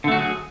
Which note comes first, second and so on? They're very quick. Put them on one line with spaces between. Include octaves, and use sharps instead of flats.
D3 A3 F#4 F#3 G#4